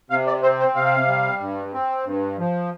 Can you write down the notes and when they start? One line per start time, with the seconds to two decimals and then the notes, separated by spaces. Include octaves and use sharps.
0.10 C3 F5
0.27 D5
0.43 C4 C5
0.59 C5
0.75 C3 F5
1.08 G3
1.40 G2
1.73 C4
2.05 G2
2.38 F3